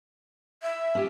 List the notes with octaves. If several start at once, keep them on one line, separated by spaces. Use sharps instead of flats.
E5
C#4 F4 G4